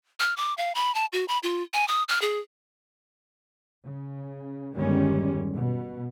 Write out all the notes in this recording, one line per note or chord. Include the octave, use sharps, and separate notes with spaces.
F6
D6
F5
B5
A5
F#4
B5
F4
G#5
D#6
F6
G#4
C#3
G1 E2 D#3 G3 G#3 C#4
B2